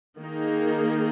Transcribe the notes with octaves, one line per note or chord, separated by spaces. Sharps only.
D#3 A#3 D#4 G#4